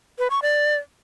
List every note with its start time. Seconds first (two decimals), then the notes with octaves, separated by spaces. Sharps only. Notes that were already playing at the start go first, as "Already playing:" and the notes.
0.19 B4
0.30 C#6
0.42 D5